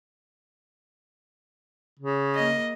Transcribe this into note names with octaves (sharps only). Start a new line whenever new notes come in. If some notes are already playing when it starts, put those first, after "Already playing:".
C#3
A#3 D#5